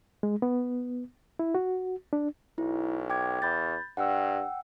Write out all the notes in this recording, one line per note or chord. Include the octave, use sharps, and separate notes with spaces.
G#3
B3
E4
F#4
D4
B1 E4
G5 D6 G#6
E2 B5 G6 A6
G2 F#5 G5 E6